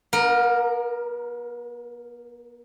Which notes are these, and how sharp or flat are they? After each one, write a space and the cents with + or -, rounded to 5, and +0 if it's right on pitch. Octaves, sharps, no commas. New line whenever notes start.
B3 -45 A#4 +0